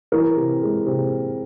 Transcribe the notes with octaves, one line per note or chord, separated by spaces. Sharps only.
E3 A#4
C3
G#3
C3